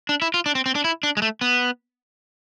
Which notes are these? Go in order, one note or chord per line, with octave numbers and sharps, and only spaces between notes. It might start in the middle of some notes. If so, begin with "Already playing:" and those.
D4
E4
F4
D4
C4
C4
D4
E4
D4
G#3
A3
B3